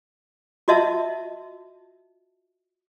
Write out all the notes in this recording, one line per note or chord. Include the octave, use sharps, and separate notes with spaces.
F4 F#4 D#5 E5 A5